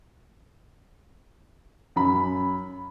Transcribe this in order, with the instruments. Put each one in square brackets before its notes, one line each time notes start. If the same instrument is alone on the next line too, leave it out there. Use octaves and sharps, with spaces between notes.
[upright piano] F#2 B5